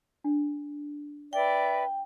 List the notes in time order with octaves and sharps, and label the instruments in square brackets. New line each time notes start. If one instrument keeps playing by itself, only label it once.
[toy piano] D4
[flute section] B4 D5 E5 [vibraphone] G5